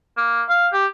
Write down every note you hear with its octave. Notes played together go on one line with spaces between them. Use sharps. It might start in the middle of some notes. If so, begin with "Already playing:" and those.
A#3
F5
G4